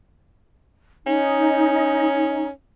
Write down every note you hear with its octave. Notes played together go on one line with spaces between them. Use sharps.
C#4 D#4